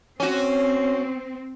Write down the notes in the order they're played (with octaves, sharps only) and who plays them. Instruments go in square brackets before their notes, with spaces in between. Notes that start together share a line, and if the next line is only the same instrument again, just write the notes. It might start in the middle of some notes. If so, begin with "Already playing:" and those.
[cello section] C4 [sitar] C#4 F#4